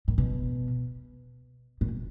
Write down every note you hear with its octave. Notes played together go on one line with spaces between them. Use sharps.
A#2
B2
A#2